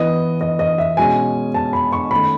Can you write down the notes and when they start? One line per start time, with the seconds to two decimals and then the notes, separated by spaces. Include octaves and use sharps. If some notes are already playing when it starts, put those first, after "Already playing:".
Already playing: E3 B3 D#5
0.41 D#5
0.59 D#5
0.78 E5
0.97 B2 G#3 C#4 G#5
1.54 A5
1.73 B5
1.93 C#6
2.11 D#3 A3 C#4 B5